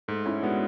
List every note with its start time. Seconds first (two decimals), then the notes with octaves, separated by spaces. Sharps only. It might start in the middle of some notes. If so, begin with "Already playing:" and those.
0.08 G#2 A3
0.25 C#4 E4
0.42 G#3 B3 D4 F#4